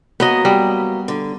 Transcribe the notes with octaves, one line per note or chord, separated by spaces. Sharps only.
F#3 A#3 B3 D#5
G3
D3